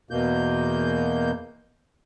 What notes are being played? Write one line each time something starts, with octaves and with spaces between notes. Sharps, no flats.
E2 B2 A#3 G6